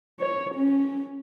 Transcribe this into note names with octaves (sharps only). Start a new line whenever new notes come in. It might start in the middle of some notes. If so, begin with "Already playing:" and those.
C#5
C#4